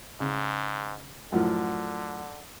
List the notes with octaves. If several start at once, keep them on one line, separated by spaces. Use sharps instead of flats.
G#2 C#3
F#2 A2 D3 F3